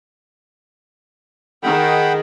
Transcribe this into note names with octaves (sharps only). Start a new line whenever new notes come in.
D#3 G#4 F#5 G5 B5